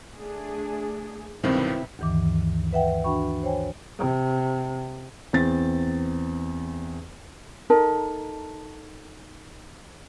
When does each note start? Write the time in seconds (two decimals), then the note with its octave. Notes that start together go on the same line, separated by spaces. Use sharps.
0.13 A3 D4 G#4
1.43 B1 G2 C3 D#3 C4 E4 A#4 B4
1.99 D2 G2 D#3 E3 D6
2.73 B4 E5 F#5 G5
3.04 D4 F#4 G5 B5 C#6
3.43 C5 C#5 G5 G#5
3.98 C3
5.33 E2 C4 A6
7.70 D#4 A4 A#4 A5